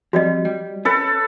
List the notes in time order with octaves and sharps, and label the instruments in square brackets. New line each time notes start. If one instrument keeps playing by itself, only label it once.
[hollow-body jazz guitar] F2 G3 [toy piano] F#4 D5 D#5
[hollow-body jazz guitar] G3
[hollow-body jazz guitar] C#4 [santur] A4 B4